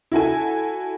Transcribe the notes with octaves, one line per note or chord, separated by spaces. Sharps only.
E4 F#4 A4 G#5